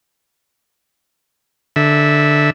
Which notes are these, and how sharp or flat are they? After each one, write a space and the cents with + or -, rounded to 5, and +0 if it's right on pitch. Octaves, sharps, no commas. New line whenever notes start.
D3 +0 E5 -15